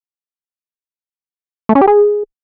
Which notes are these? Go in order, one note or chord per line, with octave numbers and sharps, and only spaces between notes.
A3
C#4
G4
G#4